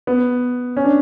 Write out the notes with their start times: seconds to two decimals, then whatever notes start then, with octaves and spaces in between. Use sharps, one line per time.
0.07 B3
0.77 C#4
0.84 D4